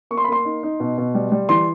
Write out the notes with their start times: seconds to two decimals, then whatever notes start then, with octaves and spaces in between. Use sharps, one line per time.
0.11 A#3 C#6
0.17 C6
0.24 B5
0.28 A#3 C6
0.45 D#4
0.63 D#4
0.80 B2
0.98 B2
1.14 G3
1.32 G3
1.49 E3 C6